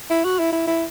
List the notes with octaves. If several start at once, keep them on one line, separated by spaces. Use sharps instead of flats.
E4
F#4
E4
E4
E4